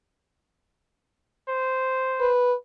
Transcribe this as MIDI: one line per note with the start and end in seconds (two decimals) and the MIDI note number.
1.49 2.33 72
2.20 2.53 71